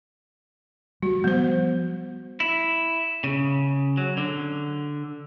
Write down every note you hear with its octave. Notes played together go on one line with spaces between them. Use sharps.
G3 F#4
F3 G3 B3 C5
E4
C#3
F#3
D3